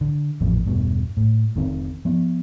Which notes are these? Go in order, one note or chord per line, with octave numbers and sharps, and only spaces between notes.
D3
A1 F2 A#2
E1 G2 B2
A2
F1 D#3 C4
F3 B3